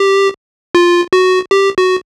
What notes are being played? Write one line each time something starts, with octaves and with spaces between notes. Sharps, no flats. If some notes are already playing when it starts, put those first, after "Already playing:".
Already playing: G4
F4
F#4
G4
F#4